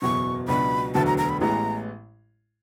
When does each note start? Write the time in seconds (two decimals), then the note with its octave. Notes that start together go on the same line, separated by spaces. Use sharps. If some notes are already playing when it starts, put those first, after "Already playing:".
0.02 F#1 E2 B2 F#3 C#6
0.48 C#2 B2 F#3 B3 D4 B5
0.94 E1 D2 D3 F#3 B3 A5
1.06 A#5
1.18 A#5
1.29 B5
1.41 A1 A2 E3 G#3 B3 A#5